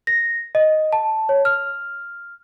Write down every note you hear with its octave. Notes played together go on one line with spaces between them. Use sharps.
A#6
D#5
A5
C#5
F6